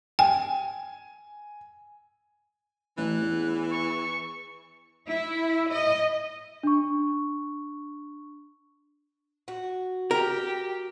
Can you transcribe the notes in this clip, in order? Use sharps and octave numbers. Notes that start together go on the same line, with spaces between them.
G5 G#5
A1 E3 F#6
E2
C#6
E4
D#5
D4 C#6
F#4
G4 A#4